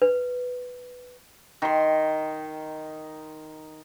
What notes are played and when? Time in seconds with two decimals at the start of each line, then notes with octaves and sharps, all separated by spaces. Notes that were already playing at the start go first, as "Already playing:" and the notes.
0.02 B4
1.62 D#3 C6